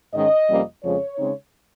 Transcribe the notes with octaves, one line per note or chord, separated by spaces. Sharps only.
G#2 D#3 G#3 C#4 D#5
F2 C3 G3 A#3 C#4
F2 C#3 F3 G#3 C#5
C#3 G#3 C4 D#4